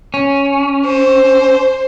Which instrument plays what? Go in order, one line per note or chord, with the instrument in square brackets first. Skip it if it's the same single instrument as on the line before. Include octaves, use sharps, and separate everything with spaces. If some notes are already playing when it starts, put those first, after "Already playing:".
[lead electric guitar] C#4
[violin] C5